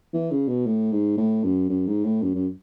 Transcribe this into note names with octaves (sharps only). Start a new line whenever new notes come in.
E3
C#3
B2
A2
G#2
A2
F#2
F#2
G#2
A2
F#2
F#2